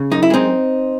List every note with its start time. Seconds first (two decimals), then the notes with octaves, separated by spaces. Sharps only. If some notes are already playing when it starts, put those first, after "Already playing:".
Already playing: C#3
0.11 F#2 D#4
0.23 E4
0.30 G#3 C4 D#4